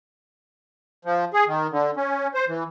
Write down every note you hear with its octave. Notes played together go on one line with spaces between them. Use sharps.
F3
G#4
D#3
D3
C#4
C5
E3